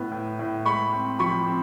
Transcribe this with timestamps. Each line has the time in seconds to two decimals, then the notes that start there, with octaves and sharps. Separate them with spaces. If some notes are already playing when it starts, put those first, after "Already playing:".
Already playing: A2 B3
0.12 A2
0.39 A2
0.65 G#3 B5 C#6
0.92 C4
1.19 F3 B5 C#6
1.46 C4